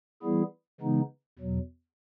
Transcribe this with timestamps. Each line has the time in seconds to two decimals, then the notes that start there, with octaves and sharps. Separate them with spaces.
0.23 E3 G3 B3 E4 G#4
0.80 C#3 E3 G#3 B3 D#4
1.39 E2 B2 F#3